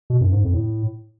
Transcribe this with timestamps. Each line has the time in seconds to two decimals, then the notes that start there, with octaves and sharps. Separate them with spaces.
0.10 B2
0.21 F#2
0.32 G#2
0.43 F2
0.53 A2